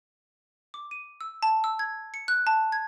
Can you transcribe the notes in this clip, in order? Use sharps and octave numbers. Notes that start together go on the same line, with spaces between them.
D6
D#7
E6
A5
E6
G#6
C#7
F#6
A5
G#6